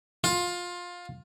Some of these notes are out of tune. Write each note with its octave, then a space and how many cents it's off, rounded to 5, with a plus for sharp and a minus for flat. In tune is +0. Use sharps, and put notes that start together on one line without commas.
F4 +20